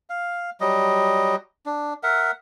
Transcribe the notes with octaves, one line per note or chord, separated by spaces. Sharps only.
F5
F#3 G3 D#5
D4
A#4 E5 F#5